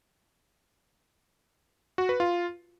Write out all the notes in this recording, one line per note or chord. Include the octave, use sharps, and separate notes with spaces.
F#4
B4
F4